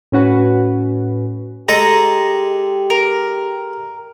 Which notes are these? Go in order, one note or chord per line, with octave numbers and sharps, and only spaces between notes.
A2 C#4 F#4 B4
G#3 G4 A4 D#5 A#5
A#4